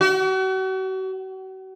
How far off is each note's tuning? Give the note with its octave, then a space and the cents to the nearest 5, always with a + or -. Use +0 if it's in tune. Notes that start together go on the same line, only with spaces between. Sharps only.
F#4 +40